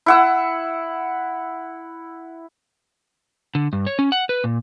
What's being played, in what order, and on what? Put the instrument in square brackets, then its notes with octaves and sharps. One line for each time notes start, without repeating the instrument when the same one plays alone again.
[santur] E4 F#5 E6
[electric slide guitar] D3
G2
C#5
C#4
F#5
B4
A#2